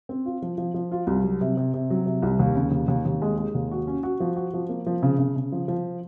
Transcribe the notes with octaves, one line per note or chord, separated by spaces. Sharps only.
C4
F4
F3
F3
F3
F4
C2
F#3
C3
C3
C3
F#3
C3
C2
D#2
C#3
D#2
D#2
D#2
G#3
G#3
D#2
F#4
C#4
F#4
F3
F#4
F3
A#3
F3
C#3
C#3
C#3
F3
F3